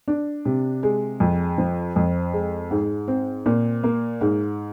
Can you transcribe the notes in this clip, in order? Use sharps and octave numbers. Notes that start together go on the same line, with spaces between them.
D4
C3
G#3
F2
F3
F2
G#3
G#2
C4
A#2
A#3
G#2